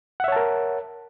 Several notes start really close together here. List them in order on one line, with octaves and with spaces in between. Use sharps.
F#5 E5 C#5 A5 A#4